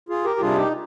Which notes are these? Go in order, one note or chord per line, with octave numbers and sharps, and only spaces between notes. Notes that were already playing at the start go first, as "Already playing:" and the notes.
F4 G#4
G4 A#4
G4
C3 G3 D4 F4 G#4
D#4 G4